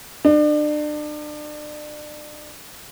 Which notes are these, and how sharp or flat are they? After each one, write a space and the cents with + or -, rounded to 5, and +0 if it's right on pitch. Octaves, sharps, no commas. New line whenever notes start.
D4 +35